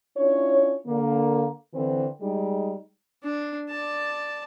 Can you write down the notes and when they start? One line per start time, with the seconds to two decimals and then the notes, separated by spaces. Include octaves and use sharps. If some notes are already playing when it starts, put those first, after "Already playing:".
0.17 C#4 D4 E4 F4 C#5
0.87 D3 A#3
1.74 D3 E3 C4
2.21 G3 G#3 D#4
3.24 D4
3.69 D5 A5